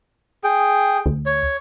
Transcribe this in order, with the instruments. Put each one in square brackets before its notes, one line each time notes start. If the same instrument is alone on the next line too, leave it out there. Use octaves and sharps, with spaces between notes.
[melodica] G#4 G5
[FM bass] D2
[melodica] C#5